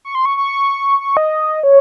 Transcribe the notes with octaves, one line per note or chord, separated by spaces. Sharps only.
C#6
C6
C#6
C#6
C#6
D#5
C#5